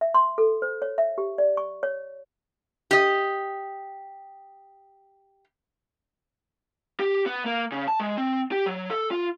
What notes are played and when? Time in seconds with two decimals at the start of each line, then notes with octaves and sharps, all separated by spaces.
0.01 E5
0.14 C6
0.38 A4
0.62 C5
0.82 C#5
0.98 E5
1.18 G4
1.38 D5
1.57 C#6
1.83 C#5
2.91 G4 D#5
7.00 G4
7.26 B3
7.46 A#3
7.72 C#3
7.88 A5
8.00 G#3
8.17 C4
8.51 G4
8.66 F#3
8.90 A4
9.11 F4